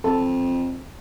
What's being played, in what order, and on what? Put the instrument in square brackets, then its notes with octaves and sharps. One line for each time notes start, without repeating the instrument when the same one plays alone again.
[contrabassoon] F2 [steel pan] A4